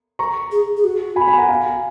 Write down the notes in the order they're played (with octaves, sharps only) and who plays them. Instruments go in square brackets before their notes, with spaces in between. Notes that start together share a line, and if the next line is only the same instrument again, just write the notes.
[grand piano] A#5 C#6
[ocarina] G#4
G#4
F#4
[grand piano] G#5 B5
G#5 B5
F#5 A#5
F5 G#5